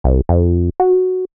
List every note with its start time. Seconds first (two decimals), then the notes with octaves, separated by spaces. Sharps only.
0.04 C2
0.29 F2
0.80 F#4